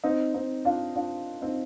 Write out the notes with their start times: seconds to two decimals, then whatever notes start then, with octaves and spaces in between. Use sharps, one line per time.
0.04 C4 D#4
0.34 C4 D#4
0.65 D4 F4
0.96 D4 F4
1.42 C4 D#4